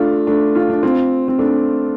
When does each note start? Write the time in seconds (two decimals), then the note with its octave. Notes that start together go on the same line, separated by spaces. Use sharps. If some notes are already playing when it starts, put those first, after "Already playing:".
Already playing: A3 D4 F4
0.27 A3 D4
0.55 F4
0.70 D4
0.83 C4 F4
1.28 C4
1.38 A3 D4